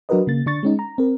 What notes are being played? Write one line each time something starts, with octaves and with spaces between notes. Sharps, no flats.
F#3 D4 F#4 A#4 B4 D#5
C#3 A#3 A6
D3 D4 C#6 A6
G#3 C#4 D#4
A#5
C4 A#4